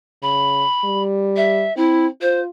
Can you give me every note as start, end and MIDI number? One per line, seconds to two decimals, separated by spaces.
0.22 0.64 49
0.22 1.02 83
0.84 1.66 55
1.36 1.74 76
1.76 2.08 60
1.76 2.05 64
2.21 2.48 65
2.21 2.40 72